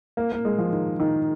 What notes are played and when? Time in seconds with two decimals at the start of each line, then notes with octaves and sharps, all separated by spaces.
0.17 A#3
0.32 A#3
0.45 G#3
0.58 F3
0.72 D#3
1.00 D#3